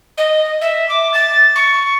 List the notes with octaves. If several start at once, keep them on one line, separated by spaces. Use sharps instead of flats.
D#5
E5
D6
A6
C#6